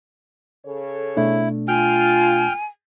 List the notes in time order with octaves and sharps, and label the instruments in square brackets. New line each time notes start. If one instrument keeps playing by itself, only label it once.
[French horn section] C#3 A4 C#5
[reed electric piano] B2 A3 D4 [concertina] E4
[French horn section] F4 [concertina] G5 F6 [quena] G#5